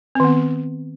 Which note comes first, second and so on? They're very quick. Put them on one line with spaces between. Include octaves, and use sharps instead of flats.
C4 D#3 B3